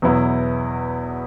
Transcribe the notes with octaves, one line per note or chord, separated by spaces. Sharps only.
E2 B2 F#3 B3 E4